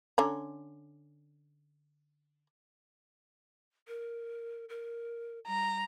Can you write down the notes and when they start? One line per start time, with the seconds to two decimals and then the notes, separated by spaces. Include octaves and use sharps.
0.18 D3 C#4 A#5
3.88 A#4
4.69 A#4
5.47 G3 A#5